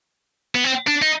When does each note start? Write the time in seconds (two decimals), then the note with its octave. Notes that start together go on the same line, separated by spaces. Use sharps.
0.55 B3
0.64 C4
0.87 D4
1.02 D#4